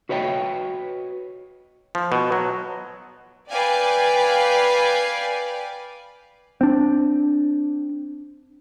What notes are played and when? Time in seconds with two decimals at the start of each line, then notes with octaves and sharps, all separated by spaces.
0.09 F#4 B4 C#5 D#5 G5
1.95 F3
2.12 B2
2.32 F#3
3.51 B4 D5 F5 G5 G#5
6.61 C4 D4